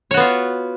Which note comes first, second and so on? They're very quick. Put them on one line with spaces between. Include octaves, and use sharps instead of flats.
C#5 F#4 B3 F4